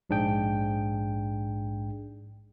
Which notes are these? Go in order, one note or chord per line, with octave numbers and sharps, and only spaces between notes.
A#1 G#2 D4 G#4 G5